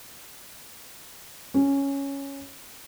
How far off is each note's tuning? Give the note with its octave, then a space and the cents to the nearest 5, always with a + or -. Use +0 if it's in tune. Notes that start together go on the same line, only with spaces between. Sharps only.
C#4 +0